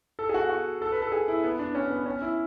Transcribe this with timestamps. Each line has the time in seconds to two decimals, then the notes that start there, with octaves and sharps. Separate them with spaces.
0.19 A4
0.29 G#4
0.34 F#4
0.49 F#4
0.82 A4
0.92 B4
1.02 A4
1.12 G#4
1.28 E4
1.44 B3
1.59 D4
1.75 C#4
1.90 B3
2.06 C#4
2.22 E4